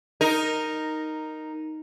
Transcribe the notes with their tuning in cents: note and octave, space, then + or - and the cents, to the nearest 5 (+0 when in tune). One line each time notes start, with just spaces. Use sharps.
D#4 +0 A#4 -5